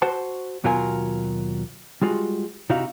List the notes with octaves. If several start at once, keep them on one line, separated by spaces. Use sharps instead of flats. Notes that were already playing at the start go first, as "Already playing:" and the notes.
F#4 C5 F#5 A5
D#2 B2 F#3 F4 A#4 G#5
G3 G#3 F4 F#4
C3 D#4 E4 F#4 F5